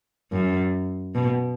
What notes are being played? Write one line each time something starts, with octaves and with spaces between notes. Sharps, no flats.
F#2
B2